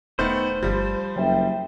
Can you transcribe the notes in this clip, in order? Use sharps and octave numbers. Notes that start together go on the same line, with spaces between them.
E1 D#3 A3 B3 C5
G1 F3 G3
F#1 F#3 E5 G5